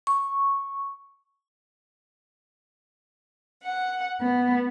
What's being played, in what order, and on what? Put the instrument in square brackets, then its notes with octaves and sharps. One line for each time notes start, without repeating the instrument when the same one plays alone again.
[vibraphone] C#6
[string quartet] F#5
B3